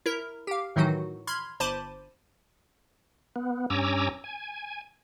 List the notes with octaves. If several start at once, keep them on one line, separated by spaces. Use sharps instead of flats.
E4 A#4
G4 F5
A2 D#3 E3 F#3 D#4 F#4
B5 C6 F6 G#6
G1 C5 A5 B5 D6 D#7
B3
G2 C#4 G#5 A#5 D6 E6
G#5